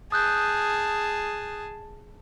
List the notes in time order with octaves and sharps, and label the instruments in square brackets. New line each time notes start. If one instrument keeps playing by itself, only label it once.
[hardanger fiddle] G#4 A5 [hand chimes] D#6 F#6 G6